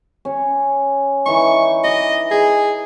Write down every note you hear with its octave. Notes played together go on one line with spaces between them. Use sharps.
C#4 C#5
E3 D#4 C#6
D#5 D6
G#4 D#5 G#5